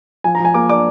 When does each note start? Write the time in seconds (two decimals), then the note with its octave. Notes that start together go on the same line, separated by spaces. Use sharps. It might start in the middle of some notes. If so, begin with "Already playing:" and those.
0.24 F3 G#5
0.35 A#5
0.40 F3
0.45 G#5
0.54 A#3 D6
0.69 D4 D6